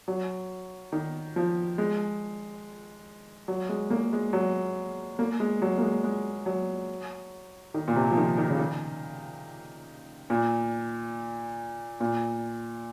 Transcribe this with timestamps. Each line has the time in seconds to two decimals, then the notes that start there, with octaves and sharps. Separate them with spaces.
0.08 F#3
0.92 D#3
1.36 F3
1.78 G#3
3.48 F#3
3.69 G#3
3.90 A#3
4.13 G#3
4.33 F#3
5.19 A#3
5.40 G#3
5.62 F#3
5.78 A#3
5.82 G#3
6.04 G#3
6.46 F#3
7.74 D#3
7.88 A#2
7.96 C3
8.11 F3
8.17 D#3
8.38 D#3
8.50 C#3
8.59 D#3
10.30 A#2
12.00 A#2